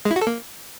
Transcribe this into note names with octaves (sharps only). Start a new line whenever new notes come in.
G#3
E4
F#4
A4
A#3